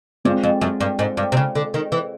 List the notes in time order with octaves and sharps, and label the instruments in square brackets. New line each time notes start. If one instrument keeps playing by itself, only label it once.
[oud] G2 [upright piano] G#3 C4 F4
[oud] F2
F#2
G2
G#2
G2
C3
C#3
D3
D#3
E3